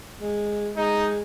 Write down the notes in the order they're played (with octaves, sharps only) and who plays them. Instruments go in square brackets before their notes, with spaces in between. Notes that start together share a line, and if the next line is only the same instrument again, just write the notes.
[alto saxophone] G#3
[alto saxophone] G#3 [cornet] D#4